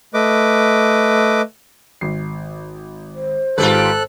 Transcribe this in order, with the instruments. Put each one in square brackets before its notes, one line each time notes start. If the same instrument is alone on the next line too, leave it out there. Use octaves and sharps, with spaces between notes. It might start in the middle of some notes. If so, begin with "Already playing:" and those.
[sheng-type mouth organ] A3 B4 D#5 D6
[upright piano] G#1 C7
[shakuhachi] C5
[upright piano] G#1 G#2 [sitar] F4 G4 B4 [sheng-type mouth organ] A4 F#6